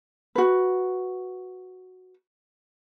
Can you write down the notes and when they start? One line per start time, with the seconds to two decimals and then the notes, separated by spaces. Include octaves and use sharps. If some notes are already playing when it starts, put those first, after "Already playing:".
0.35 F#4 B4